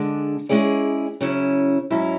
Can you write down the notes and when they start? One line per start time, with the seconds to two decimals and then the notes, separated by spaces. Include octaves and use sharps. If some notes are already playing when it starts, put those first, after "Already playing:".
Already playing: D3 G#3 D4
0.49 G#3 C#4 E4 G#4 D5
1.21 C#3 F#3 C#4 E4
1.91 G#2 F#3 C#4 E4